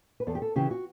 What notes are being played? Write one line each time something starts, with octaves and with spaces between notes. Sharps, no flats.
B4
E2 A4
G4
A4
C#3 E3 G4
F#4